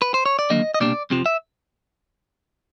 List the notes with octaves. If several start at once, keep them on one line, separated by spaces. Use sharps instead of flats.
B4
C5
C#5
D5
D#2 D3 F#3 A#3 D#5
D#5
C2 B2 G3 A#3 D4 D5
F2 C3 F3
E5